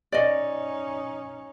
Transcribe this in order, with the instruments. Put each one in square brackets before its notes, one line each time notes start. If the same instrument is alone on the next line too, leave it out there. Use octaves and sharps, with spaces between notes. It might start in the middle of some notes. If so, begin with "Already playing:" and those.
[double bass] C#4 D#4 [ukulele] D5 D#5